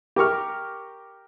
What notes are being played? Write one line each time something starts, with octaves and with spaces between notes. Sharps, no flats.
G4 A#4 C#6 F6